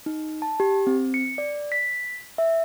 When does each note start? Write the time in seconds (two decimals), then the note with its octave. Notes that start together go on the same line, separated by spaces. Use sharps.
0.06 D#4
0.42 A5
0.60 G4
0.87 C4
1.14 C#7
1.38 D5
1.72 B6
2.38 E5